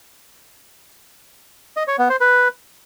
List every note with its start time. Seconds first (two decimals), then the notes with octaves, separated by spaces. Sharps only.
1.77 D#5
1.88 C#5
1.99 B3
2.10 C5
2.21 B4